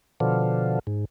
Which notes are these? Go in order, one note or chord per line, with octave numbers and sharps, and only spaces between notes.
B2 D3 F3
G#2